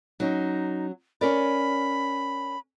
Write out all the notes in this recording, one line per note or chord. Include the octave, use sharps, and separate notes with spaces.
F#3 C#4 D#4
C#4 A#4 D5 B5